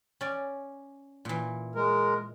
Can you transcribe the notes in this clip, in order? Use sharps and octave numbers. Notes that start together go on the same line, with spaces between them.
C#4 D5
A#2 E3
G#3 A#4